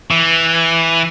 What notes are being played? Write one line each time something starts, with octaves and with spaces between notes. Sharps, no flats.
E3